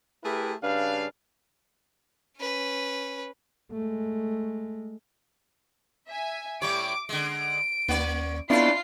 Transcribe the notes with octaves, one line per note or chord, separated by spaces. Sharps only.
A3 E4 G4 G#4 A#4 B4
G2 C#3 D4 B4 F5
C#4 B4
G#3 A3
E5 G#5
A2 G3 C#5 D6 D7
D3 G#3 D7
D#2 A#3 C#4 D5
B3 C#4 D4 E4 F4 A4 C7